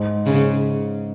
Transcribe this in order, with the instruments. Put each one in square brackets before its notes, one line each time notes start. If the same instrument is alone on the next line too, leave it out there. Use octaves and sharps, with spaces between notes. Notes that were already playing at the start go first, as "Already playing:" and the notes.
Already playing: [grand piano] G#2
[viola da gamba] C#3